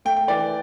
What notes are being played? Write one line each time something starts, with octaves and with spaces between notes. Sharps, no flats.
A3 G5
G5
E3 D5